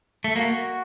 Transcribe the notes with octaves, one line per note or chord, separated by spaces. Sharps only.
A3
A#3 F#4